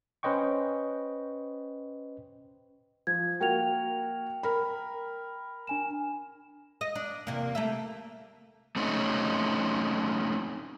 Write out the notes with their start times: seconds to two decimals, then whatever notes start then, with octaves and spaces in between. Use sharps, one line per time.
0.23 C#4 B4 C5 D#5 G5 C#6
3.07 F3 G#6
3.40 A#3 F#4 A#4 G5 F7
4.43 A#4 B5
5.67 D4 G#5 E7
6.81 D#5
6.95 D4
7.27 E2 C3 A#3
7.55 A3 A#3 E5
8.76 A3 C4 C#4 D#4